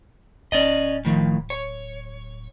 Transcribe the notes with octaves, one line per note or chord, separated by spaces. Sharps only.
D1 C#4 D5 D#5
A2 D#3 F3
C#5